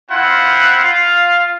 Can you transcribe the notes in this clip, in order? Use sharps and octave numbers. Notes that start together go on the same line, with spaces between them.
C4 E4 F4 C5 F5 F#5
F4 F5